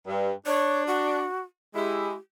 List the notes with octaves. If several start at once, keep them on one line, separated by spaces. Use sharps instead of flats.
G2
D4 C#5
F#4
G#3 E4 G4